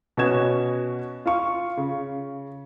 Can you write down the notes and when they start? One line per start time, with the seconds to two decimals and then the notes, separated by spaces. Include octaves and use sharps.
0.17 B2 C#4 F#4 G#5 G#6 E7
1.26 F4 F5 C#6
1.77 C#3